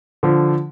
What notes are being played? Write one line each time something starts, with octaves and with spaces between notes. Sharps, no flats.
D3 F3